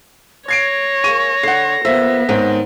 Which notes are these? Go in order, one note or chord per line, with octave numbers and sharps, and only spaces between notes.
C#5 G#6 A#6 C7 D7
A#3 G#4 C#6 D#7
D3 F#5 C7
F3 A#3 B3 E5
G#2 D#3 C4 C#4